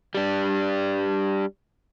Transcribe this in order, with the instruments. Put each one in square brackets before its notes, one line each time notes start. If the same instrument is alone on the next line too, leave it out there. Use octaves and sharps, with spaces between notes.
[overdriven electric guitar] G3 D4